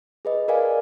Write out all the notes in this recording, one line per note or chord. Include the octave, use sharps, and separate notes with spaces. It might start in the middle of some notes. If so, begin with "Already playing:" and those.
G#4 B4 D#5
A#4 B4 D5 D#5 F5 G#5